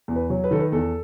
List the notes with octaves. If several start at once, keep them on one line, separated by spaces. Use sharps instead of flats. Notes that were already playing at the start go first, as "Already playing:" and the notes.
E2
B4
F#3
B4
D#3 A4
B4
E2 A4